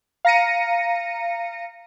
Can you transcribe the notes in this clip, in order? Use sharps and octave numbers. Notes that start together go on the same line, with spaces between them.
F5 A#5 A#6 C#7 D#7